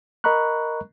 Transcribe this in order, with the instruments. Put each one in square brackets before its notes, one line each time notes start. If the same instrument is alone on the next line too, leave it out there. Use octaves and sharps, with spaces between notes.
[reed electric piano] A#4 D#5 A#5 B5 C#6 F#6